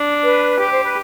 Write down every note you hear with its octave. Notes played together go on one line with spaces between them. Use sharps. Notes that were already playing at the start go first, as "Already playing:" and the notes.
Already playing: D4
B4
G4
C5
B4